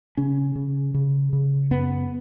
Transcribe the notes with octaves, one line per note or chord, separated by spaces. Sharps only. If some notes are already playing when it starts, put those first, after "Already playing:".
C#3 C#4
C#3
C#3
C#3
F#2 B3